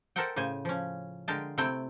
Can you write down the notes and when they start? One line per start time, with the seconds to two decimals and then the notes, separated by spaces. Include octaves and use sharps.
0.16 A4 A#4 C5 E5 F#5 G5
0.36 A2 C#3 C5 G#5
0.65 F3 C#4
1.28 D3 G#3 A#4 F5 G5 A5
1.58 C3 A3 C4 E4 G5